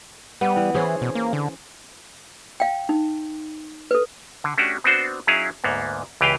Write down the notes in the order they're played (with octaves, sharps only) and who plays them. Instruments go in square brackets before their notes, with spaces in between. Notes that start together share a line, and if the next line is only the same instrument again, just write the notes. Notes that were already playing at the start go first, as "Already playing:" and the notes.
[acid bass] G3 [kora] B3
[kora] E3
[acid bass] E3 [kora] C#4 G#4 C5
[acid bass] B2
A#3
D3
[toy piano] F5 G5
D#4
A4 B4
[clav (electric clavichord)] D3
A3 C#4 D4 F#4 G4
B3 C4 D4 F#4 C5
F#3 C#4 D#4 E4 G#4 F5
D2 G#2 A#3 B3
C#2 E3 G4 B4 F5 G5